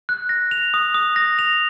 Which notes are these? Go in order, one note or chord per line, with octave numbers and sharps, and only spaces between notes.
F#6
A#6
F7
D#6
D#6
A#6
F7